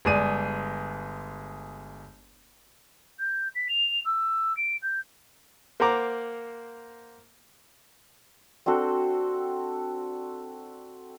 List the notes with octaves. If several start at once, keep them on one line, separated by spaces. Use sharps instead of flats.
G1 G#3 G#4 D5 D#7
G6
B6
F7
E6
D7
G6
A#3 C5 F#5 A#5 D6
C4 D4 F#4 A4